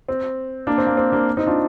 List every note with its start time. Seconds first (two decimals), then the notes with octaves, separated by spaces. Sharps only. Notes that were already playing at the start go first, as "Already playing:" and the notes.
0.08 C4
0.67 A#3 D4
0.78 C4
0.87 A#3
0.97 C4
1.12 A#3 D4
1.37 C4 D#4
1.47 D4 F4